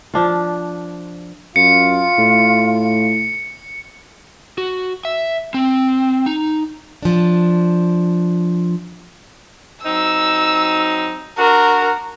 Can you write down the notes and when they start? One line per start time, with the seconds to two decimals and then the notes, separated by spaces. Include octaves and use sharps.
0.14 F3 D4 F4
1.56 F#2 F4 C#7
2.18 A2
4.58 F#4
5.05 E5
5.54 C4
6.26 D#4
7.03 F3 D4
9.85 F#3 C4 D#4 E6
11.38 D4 F#4 A#4